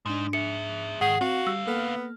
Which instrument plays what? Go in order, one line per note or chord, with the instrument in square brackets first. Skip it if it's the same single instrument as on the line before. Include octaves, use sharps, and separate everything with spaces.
[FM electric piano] G#2 D4 [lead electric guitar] G#3 D#4
[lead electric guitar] G#4 E5 [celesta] C#7
[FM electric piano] G#2 [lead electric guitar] D#3 [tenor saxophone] G#4 [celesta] F#5
[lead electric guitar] D3 F5 [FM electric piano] C4 [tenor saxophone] F#4
[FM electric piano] G3 [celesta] E6
[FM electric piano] A#3 A4 F6 [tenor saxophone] B3